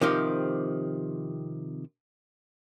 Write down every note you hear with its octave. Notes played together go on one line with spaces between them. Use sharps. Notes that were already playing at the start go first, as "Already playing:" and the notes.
C3 D#3 F3 G4